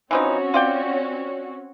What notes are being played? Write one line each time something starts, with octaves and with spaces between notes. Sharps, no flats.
E3 F3 C4 C#4 D#4 F#4
F4 D5 G5